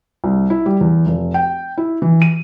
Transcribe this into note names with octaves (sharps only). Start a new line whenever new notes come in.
C2
E4
G3
E2
F1
G5
E4
E3
D#7